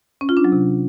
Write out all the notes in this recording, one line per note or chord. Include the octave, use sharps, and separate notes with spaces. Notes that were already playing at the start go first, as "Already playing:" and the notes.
C#4
F4
D4
F#3
C3